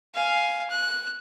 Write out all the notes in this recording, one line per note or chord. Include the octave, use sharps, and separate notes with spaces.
F5 G#5
F#6